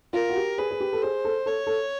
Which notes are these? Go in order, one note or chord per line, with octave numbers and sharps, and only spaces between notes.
F4 A#4
F#4
G4
G#4 B4
G#4
G4
A4
G#4 C5
A4
A4 C#5
A4